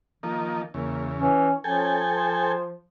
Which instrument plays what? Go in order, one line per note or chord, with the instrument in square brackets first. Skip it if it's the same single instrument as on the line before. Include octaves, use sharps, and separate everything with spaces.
[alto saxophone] D#3 [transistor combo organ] F3 A#3 D#4
[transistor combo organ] E2 C#3 [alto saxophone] A#3
[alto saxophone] E3 [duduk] C#4
[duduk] F3 [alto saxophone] C#4 [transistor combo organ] A4 G5 G#5
[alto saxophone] C5